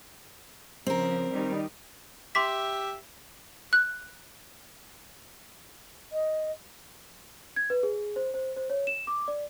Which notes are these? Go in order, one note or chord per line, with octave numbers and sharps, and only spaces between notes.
C#3 F3 C4 A#4
D#3 G3 D#4
G4 E5 C6 D6 B6
F#6
D#5
G#6
B4
G#4
C5
C5
C5
C#5
E7
D6
D5